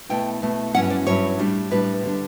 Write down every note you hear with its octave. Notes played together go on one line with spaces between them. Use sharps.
B2 A3 E4 G5
B2 A3 E4
G2 F#3 C#4 E4 F#5
D5
G2 F#3 C#4 E4 C#5
A2 G3 D4
A2 G3 D4 B4
D3 G3 D4